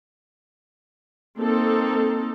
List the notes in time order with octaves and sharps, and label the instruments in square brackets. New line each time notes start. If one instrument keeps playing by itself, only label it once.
[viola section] A#3 C4 D#4 A4